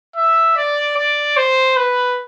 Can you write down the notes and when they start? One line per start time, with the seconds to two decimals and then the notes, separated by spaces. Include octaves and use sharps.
0.16 E5
0.57 D5
0.97 D5
1.37 C5
1.77 B4